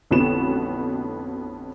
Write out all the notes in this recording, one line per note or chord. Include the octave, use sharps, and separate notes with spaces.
A1 F2 D3 B3 F#4 E7